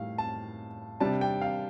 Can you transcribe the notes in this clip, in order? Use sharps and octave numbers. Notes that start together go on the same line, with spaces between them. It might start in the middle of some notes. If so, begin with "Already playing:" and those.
Already playing: A2 G3 F5
A5
C3 G3 D4 A5
G5
F5